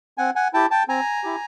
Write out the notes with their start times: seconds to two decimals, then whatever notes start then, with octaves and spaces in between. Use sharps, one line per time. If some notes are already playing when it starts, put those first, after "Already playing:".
0.18 C4 F#5 G#5
0.36 F#5 G#5
0.53 E4 G4 G5 A5
0.71 G5 A5
0.88 C4 G#5 A#5
1.24 E4 G4